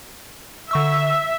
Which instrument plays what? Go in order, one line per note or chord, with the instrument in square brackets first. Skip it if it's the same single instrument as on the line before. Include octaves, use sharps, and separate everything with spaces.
[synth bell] D3 C#6 E6 [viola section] E5